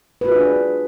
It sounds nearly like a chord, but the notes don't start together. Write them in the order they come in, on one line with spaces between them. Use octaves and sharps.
B4 F#4 F4 G#4 D4